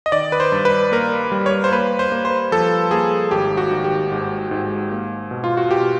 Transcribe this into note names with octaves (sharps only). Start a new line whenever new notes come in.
D#5
D#3 D5
B4
C5
G2
B4
A#3 A#4
G3
C#5
C5
A#3 B4
C5
A#3
C5
F3 A4
A#3 G#4
G#1 G4
F#4
D#3
G4
G#2
G#2
A#3
B2
F4
F#4
B2 G4